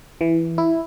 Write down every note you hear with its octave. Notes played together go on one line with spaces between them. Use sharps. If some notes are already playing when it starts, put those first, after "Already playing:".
E3
E4